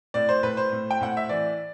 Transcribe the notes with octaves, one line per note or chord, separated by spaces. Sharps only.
A2 D5
C5
A2 B4
C5
A2
G5
A2 F#5
E5
E3 D5